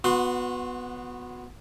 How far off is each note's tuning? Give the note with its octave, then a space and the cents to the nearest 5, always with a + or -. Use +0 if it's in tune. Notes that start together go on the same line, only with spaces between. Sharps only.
B3 +0 F#4 -25 C6 +0